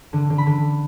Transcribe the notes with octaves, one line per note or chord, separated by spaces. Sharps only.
D3
D3
B5
D3